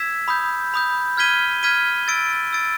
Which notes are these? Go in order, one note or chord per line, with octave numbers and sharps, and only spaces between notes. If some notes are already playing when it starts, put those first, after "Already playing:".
Already playing: E6 G#6 B6 E7
B5 D#6 G6
B5 D#6 G6
F6 G#6 B6 D#7 G7
F6 G#6 B6 D#7 G7
E6 A6 D7
E6 A6 D7